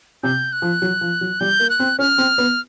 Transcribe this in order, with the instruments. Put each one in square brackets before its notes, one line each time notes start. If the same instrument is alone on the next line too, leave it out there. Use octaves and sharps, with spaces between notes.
[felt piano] C3 [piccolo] G6
[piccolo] F#6
[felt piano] F3
F#3
F3
F#3
[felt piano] G3 [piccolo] G6
[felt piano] A#3
[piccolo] F#6
[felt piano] C4
[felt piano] C#4 [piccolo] F6
[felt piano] C4
B3